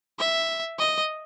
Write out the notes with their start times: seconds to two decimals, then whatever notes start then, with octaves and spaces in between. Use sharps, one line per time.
0.20 E5
0.79 D#5